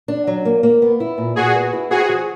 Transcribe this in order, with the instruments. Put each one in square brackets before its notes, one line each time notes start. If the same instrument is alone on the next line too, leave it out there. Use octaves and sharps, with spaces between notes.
[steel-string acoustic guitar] D4
F#3
A#3
A#3
B3
E4
A#2
[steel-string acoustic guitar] A#2 [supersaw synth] F#4 G#4
[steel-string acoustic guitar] B3
E4
[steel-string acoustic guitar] C4 [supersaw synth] F#4 G#4
[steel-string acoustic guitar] F3